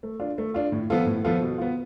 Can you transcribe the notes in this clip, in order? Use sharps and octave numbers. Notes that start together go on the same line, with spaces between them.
A3
D4 F4
A3
D4 F4
A2
F3 B3 F4 A4
A2
F3 B3 F4 A4
B2
B3 F4